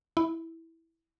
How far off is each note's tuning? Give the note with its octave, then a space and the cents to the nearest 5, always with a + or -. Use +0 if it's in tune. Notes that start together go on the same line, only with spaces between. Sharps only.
E4 -5